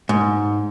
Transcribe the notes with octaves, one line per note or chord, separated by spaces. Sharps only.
G#2